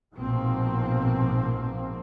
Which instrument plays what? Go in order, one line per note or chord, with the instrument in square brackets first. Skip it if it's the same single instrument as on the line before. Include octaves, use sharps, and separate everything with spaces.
[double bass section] A#1 G#2 B2 F3 A#3 C4